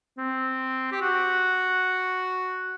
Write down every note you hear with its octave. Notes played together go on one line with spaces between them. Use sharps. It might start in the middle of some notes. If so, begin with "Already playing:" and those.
C4
G4
F#4